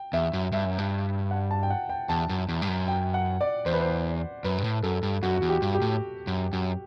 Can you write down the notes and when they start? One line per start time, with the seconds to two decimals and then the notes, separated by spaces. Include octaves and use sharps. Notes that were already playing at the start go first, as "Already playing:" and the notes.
Already playing: G5
0.13 E2 E5
0.33 F#2
0.52 G2 E5
0.65 F#2
0.78 G2
1.31 F#5
1.51 A5
1.63 G5
1.70 F#5
1.89 G5
2.09 E2 A5
2.29 F#2
2.49 E2
2.62 G2
2.68 F#2
2.88 G5
3.14 F#5
3.41 D5
3.66 E2 C5
3.73 B4
3.81 C5
4.44 F#2 B4
4.58 G2
4.64 A2
4.83 F#2 A4
5.03 G2
5.23 F#2 F#4
5.37 E2 F#4
5.49 G4
5.62 G2
5.75 G4
5.82 A2
6.27 F#2
6.53 F#2